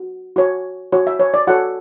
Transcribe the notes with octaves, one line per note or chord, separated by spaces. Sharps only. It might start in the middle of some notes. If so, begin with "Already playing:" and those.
Already playing: F#4
F#4 C#5
F#4 C#5
E5
C#5
D5
F#4 A4 C#5 F#5